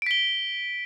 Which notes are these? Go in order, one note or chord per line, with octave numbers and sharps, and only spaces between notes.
B6 D7 G7